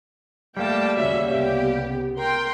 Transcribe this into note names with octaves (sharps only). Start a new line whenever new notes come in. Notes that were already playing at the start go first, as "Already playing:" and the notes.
G3 A3 A#3 G5 A5
D#2 C#3 C#4 F#4 E5
C2 C#3 B3 G4
A#4 G5 C6